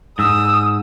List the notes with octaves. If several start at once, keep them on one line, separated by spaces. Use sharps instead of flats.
G#2 D#6 E6